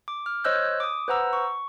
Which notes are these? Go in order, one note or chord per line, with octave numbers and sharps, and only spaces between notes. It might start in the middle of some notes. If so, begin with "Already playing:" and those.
D6
F6
C5 C#5 D#5 E6 F#6 G6
D6 D#6
B4 C5 F#5 A#5 E6
C#6